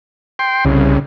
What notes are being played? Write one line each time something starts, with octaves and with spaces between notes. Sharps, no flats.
G5 C6
C2 C#3